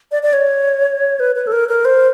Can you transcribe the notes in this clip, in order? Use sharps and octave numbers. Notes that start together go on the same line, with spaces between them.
D5
D5
C#5
B4
B4
A4
A#4
A#4
C5